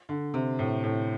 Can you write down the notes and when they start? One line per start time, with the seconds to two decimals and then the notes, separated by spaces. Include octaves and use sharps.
0.09 D3
0.34 C3
0.59 A2
0.84 A2